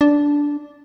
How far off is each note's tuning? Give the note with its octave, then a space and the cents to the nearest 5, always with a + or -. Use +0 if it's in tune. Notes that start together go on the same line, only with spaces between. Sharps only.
D4 -10